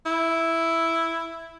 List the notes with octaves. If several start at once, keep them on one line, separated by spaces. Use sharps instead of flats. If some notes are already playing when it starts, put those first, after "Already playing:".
E4